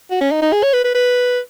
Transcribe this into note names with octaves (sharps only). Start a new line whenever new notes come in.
F#4
C#4
D#4
D#4
G#4
C#5
B4
B4
B4